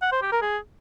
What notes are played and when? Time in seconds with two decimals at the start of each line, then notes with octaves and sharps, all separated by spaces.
0.02 F#5
0.12 C5
0.22 G4
0.32 A#4
0.42 G#4